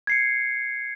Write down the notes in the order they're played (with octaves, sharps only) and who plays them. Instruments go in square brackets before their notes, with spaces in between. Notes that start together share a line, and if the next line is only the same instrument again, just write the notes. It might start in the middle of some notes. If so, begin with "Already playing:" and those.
[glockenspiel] G#6 C7 C#7